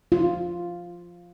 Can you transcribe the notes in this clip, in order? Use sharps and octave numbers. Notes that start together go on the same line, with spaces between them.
F4